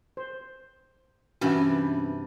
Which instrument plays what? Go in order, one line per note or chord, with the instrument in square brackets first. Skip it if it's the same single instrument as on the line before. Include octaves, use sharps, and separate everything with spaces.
[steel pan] C5
[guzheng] G2 C3 E3 [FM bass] C#4 [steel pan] F#4 E5